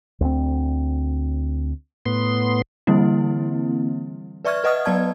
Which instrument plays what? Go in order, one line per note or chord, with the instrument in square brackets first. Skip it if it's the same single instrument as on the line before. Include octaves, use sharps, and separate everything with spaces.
[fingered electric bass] D2 C4
[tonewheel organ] A2 B3 C6
[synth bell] D3 E3 G3 A#3 C4 E4
B4 D5 E5 C#6 F6 G#6
B4 D#5 F#5 D#6 F6
F#3 B3 D5 A5 G#6